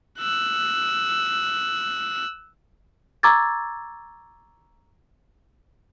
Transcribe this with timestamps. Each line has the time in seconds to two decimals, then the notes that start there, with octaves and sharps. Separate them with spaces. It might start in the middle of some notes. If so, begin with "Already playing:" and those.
0.19 E6 F#6
3.23 A#5 C#6 D6 E6 G#6 A6